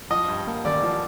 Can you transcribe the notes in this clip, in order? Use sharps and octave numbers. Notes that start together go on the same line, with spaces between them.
F3 D#5
G2
A#3
A1 D5
F3